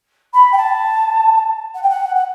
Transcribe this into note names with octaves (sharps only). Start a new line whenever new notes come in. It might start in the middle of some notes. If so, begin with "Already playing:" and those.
B5
G5
A5
F#5
G5
F#5
F#5